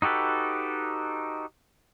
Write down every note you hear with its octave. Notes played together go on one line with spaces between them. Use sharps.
D#4 F#4 G4 A4 B4